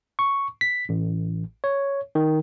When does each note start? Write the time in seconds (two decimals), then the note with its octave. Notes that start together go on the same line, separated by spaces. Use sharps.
0.19 C#6
0.61 B6
0.89 A1
1.64 C#5
2.15 D#3